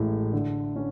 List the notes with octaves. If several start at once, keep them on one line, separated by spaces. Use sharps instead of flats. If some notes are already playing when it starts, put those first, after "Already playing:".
Already playing: A1 A2 G#3
D3
C#4